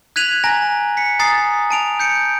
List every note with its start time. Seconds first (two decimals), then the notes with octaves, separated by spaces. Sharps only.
0.16 F#6 G#6 B6 D#7 F7 F#7
0.44 G#5 A#5 A#6
0.97 B6 C#7
1.19 G#5 A#5 D#6 A6 C7
1.70 A5 D7 F7
2.00 G6 C#7 D7